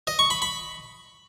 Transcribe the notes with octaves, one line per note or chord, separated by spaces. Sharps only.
D#5
C#6
B5
B5